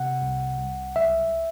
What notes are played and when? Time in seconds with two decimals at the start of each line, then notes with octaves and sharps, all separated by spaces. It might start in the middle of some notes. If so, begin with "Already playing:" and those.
Already playing: C3 F#5
0.22 C2
0.59 C2
0.96 B1 E5